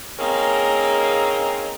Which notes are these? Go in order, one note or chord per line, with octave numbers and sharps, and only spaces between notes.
A#3 C4 C#4 D#4 G#4 A#4